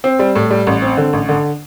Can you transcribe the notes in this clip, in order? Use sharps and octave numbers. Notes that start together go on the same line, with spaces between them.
C4
G3
A2
G3
A1
C4
D3
A1
D3